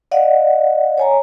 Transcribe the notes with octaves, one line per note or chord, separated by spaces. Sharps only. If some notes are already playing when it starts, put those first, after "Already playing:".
D5 D#5 F5 F#5
C#5 G#5 A#5